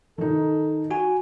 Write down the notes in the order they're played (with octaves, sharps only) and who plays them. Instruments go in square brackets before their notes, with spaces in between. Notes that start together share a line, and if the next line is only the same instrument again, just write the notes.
[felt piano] D#3 D#4 [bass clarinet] A4
[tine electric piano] F#4 G#5